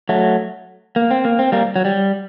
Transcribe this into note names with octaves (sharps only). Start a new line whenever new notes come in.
F#3 A3
A#3
C4
A#3
C4
G3 A#3
F#3
G3